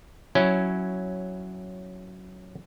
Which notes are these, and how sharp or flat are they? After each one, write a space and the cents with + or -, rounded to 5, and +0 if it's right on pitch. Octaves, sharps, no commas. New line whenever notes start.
F#3 +0 C#4 +0 E4 +0